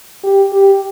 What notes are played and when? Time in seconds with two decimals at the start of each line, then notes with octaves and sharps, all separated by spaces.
0.24 G4
0.53 G4